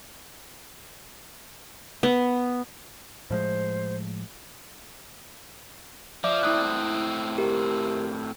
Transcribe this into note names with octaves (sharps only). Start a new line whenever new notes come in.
B3
A2 F3 G#3 C5
F3 D5 E5 D6
A2 C4 E4 D#6 F#6
G4 A#4